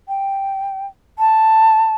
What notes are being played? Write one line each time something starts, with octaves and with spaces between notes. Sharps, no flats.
G5
A5